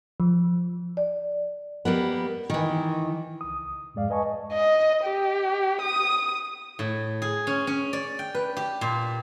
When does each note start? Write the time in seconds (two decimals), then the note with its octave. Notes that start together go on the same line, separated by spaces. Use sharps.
0.20 F3
0.97 D5
1.85 G3 A#3 B3
2.50 D#3 E3
3.41 C#2 D#6
3.94 F2 G#2 G#3 D5 F5
4.10 B4 D#5 G#5 A5 C#6
4.53 D#5
5.04 G4
5.81 D#6
6.79 A2
7.22 G#4
7.47 C#4
7.67 C#4
7.93 D5
8.19 G5
8.35 B4
8.57 G4
8.81 A#2